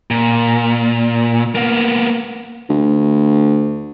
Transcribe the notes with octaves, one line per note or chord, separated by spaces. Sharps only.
A#2
A#3 B3
D2